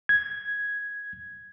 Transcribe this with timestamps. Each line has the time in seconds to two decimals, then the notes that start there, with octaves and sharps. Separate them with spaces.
0.09 G#6